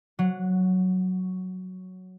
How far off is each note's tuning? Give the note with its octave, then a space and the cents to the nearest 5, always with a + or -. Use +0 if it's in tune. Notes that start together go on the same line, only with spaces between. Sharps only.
F#3 +0 F#5 -15